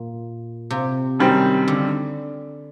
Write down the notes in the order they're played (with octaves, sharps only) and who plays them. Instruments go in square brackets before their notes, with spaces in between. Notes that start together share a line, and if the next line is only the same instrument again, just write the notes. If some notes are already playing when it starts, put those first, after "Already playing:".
Already playing: [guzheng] A#2
C3
[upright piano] F#2 D#3 G3 C4
[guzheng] D3